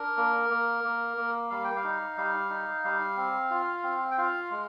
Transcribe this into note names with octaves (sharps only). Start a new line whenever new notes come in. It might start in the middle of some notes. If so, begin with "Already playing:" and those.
Already playing: D4 A#4
A#3
A#3
A#3
A#3
G3 F5
G5
F5
D#4
G3 F5
D#4
G3 F5
C4
F4
C4
G5
F4 F5
G#3